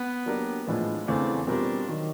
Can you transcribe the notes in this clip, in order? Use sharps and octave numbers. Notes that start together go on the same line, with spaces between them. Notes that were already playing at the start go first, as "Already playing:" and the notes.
Already playing: B3
F#3 A#3 D4 G4 A#4
A2 F3 G#3 B3 D4
E2 C#3 E3 A3 C4 D4
B2 G3 C4 D4 F4 A#4
D#3 F#3